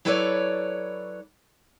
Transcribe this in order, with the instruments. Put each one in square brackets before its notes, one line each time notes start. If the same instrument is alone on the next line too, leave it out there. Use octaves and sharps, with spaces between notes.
[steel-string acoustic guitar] F#3 E4 A4 B4 C#5 D5